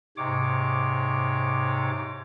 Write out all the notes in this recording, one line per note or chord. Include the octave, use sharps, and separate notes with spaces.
G#2 C3 C#5 D6